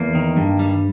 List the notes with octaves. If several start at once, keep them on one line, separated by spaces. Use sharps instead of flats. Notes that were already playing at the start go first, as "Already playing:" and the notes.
Already playing: E2 A#3
D#3
G2
G3